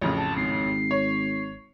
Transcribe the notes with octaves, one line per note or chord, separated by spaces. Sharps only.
A1 F2 C#3
A5
G#1 C7
C#5